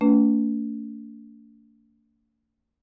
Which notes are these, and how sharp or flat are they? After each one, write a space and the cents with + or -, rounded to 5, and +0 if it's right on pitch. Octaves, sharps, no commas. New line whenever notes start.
A3 +40 D4 -45 B4 +0